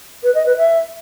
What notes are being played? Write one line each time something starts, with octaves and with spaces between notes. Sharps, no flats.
B4
D#5
B4
E5